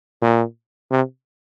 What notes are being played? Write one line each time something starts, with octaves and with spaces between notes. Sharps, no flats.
A#2
C3